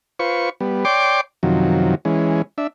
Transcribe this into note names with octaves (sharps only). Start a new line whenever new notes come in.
F4 B4 C5 C#6
G3 B3
C#5 D5 G5 C6 D6
F#2 C3 D#3 F3 F#3
E3 G#3 C#4
D4 E5